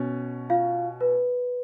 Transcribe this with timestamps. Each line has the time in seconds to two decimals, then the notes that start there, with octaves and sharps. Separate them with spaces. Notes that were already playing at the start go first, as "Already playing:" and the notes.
Already playing: B2 C#4
0.50 F4 F5
1.01 B4